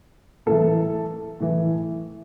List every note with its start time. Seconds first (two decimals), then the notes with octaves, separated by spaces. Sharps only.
0.46 A2 E3 A4
1.40 A2 E3